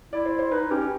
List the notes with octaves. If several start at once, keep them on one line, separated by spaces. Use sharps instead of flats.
E4 D5
C5
C5
D#4 B4
C#4 G4
G4